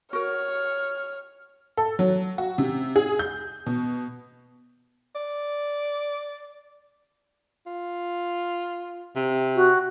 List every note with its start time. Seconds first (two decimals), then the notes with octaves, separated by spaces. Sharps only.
0.13 F#4 A#4 C#5 F6
1.77 A4
1.99 F#3
2.38 F#4
2.58 C3
2.96 G#4
3.19 G6
3.66 B2
5.15 D5
7.67 F4
9.16 C3
9.56 F#4